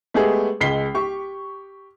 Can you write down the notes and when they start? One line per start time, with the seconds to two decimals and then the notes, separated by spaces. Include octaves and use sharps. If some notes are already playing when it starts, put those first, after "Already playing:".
0.14 G#3 A3 B3 G4 G#4
0.61 C#2 G#3 B6 C7 G7
0.95 G4 C#6